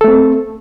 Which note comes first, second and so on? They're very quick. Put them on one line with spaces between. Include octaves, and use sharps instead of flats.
A4 A3 C4